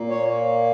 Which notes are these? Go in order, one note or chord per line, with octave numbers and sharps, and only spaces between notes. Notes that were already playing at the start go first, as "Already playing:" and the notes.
Already playing: A#2 A#3
C#5